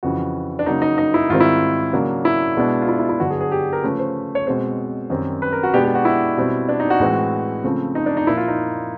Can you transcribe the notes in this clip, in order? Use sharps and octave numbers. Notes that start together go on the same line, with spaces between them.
F2 C#3 E3 F#4
D4
C#3 F#3 A#3 D#4
D#4
D#4
E4
G#2 D#3 G3 C4 F4
E4
C#3 F#3 A#3 D4
E4
B2 G#3 B3 D4
F4
E4
E4
E4
G2 D3 F#3 B3 D4 F#4
G#4
G#4
G4
A#4
C#3 F3 A3 C#4 B4
C5
C#5
B2 G#3 C4 C5
F#2 D#3 G3 C4
B4
A#4
F#4
B2 G#3 B3 D4 G4
G4
F#4
E4
B2 G3 C4
D4
D#4
F#4
A2 E3 G#3 C4
C#3 F3 A3 C4
D#4
D4
D#4
A#2 F3 A#3 E4
F4
D#4